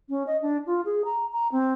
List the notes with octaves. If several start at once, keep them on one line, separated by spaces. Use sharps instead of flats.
C#4
D#5
D4
F4
G#4
A#5
A#5
C4